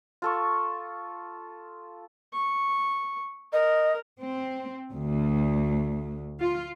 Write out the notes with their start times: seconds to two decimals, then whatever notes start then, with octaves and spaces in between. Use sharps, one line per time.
0.22 F4 A4 C#6
2.34 C#6
3.53 A#4 D#5
4.22 C4
4.92 D2
6.41 F4